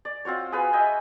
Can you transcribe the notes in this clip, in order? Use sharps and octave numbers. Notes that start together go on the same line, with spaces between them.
D5
C4 F4 F#4 C#5
G#4 B4 F5 G#5
D#5 E5 G5 G#5